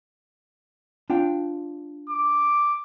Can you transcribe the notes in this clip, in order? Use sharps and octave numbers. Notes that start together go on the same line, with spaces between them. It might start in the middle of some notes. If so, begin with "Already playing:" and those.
D4 F4 G5
D6